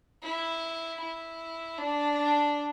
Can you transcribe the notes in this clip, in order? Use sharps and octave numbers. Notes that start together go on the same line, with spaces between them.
E4
E4
D4